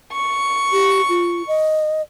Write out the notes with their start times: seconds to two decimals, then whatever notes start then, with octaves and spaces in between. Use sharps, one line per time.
0.13 C#6
0.72 G4
1.09 F4
1.47 D#5